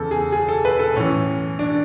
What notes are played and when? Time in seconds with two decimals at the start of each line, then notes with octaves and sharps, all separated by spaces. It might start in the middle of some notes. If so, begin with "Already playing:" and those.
Already playing: E2 C#3 E3 A4
0.11 G#4
0.32 G#4
0.48 A4
0.65 B4
0.79 A4
0.96 A2 E3 C#4
1.59 D4